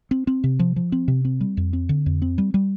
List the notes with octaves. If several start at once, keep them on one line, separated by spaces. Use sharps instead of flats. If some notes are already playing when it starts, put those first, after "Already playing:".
C4
C4
C3
F3
F3
C4
C3
C4
G3
F2
C4
D3
F2
C4
G3
G3